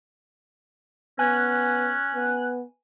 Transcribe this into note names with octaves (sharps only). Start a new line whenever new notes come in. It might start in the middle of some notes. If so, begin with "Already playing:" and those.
B3 C#4 G#5 F#6
B3